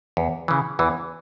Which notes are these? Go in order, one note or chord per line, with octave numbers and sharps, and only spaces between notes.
E2
C#3 E3
E2 E3